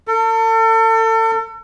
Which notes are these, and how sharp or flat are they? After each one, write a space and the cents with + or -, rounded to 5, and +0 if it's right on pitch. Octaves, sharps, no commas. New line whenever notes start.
A4 +35